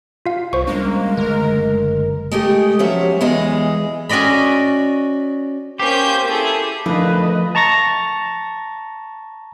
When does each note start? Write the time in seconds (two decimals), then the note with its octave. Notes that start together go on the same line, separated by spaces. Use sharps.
0.26 F4 F5
0.53 C2 C5 C#6
0.67 G3 G#3 A#3 C#4 D4
1.17 F#1 D3 A3 A#4
2.32 G#3 A3 G4 G#4
2.79 F3 F#3 C#4 E5
3.21 E2 E3 G#3 D#5
4.09 C#4 F#4 D5 D#5 B5
5.79 A#3 C#4 G4 C5 G6
6.28 E4 G#4 A4
6.86 F2 D3 D#3 F3 A3 A#3 B4 D#5
7.55 A5 A#5 C#6 A6 A#6